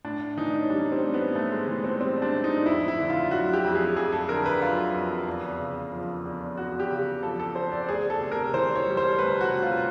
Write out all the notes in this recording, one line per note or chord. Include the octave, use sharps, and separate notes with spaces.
A2 D4
E3 D#4
C#4
G3 D4
C4
A2
B3
A2 A3
G#3
E3
C4
G3 C4
D4
A2
D#4
F2 E4
E4
D3
F4
F#3 F#4
G4
F2
G#4
F2 G#4
A4
D3 A#4
B4
F#3 F4
F2
E2
C#3
F3
E2
E2 F#4
G4
C#3
F3 A4
A4
E2 C5
D5
D2 G#4
A4
C3
A#4
E3 C5
C#5
G3
C5
D2 B4
F#4
C3
F4